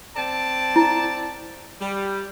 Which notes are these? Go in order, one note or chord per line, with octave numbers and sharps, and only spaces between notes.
C4 D5 A5
E4
G3